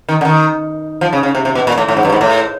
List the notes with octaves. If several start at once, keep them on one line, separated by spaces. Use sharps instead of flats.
D#3
D3
D#3
F3
C#3
C#3
C3
C3
B2
A#2
A2
A2
G#2
G2
G#2
A2